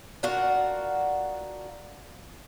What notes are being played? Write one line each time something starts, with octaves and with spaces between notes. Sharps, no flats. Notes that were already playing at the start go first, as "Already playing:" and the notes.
D4 F4 F#4 A#4